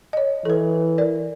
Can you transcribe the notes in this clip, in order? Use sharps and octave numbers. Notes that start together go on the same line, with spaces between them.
C#5 D#5
E3 A4 B4
A#4 D5